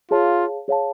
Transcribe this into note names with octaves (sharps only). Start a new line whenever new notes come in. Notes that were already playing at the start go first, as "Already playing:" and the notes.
F4 G#4 C#5 F5 A5
G#4 C#5 F5 A5